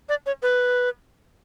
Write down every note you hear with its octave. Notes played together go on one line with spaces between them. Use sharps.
D5
C#5
B4